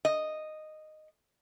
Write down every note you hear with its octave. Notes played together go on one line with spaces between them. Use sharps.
D#5